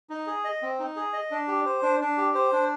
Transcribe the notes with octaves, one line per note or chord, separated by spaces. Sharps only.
D#4
G#4
D#5
C4
D#4
G#4
D#5
D4
G4
C5
D4
D4
G4
C5
D4